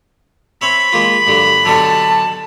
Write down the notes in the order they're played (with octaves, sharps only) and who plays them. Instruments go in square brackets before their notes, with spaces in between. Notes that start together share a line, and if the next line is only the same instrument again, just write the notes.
[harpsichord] C4 C#5 E5 [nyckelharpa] B5
[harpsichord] G#3 A#3 F4
G2 D3 F#3
[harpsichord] B2 D3 F#3 [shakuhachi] A5